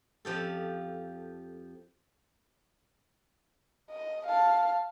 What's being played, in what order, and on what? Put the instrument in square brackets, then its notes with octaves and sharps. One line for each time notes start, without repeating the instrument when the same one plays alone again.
[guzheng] F2 F3 G4 A4
[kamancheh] D#5
F5 A5